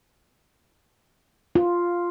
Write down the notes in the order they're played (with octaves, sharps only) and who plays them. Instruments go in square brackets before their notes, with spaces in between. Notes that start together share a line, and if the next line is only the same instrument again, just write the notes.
[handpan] F4